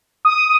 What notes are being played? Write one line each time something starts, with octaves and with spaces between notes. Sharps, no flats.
D#6